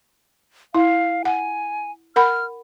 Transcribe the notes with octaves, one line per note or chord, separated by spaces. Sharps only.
E4 F5
F#5 G#5
A#4 F#5 B5 F6